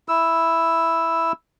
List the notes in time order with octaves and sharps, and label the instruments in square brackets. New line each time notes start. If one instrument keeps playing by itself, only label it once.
[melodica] E4 E6